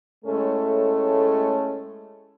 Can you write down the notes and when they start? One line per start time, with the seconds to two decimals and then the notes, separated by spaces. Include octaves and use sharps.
0.25 A2 G#3 A3 C#4 A4